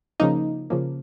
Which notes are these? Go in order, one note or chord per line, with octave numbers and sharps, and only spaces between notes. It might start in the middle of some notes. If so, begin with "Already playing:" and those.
C#3 F3 A#3 D#4
C#3 F3 A#3